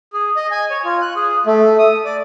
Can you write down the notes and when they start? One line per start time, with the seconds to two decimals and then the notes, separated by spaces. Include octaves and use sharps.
0.13 G#4
0.36 D#5
0.51 G#5
0.70 C#5
0.85 F4
1.02 F#6
1.16 G#4
1.46 A3
1.78 D#6
2.05 D5